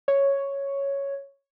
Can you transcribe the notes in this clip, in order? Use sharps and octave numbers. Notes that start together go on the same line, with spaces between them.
C#5